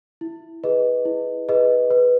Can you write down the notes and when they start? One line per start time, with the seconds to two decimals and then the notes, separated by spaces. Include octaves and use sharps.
0.21 E4
0.64 G#4 B4 D#5
1.05 E4
1.49 G#4 B4 D#5
1.90 B4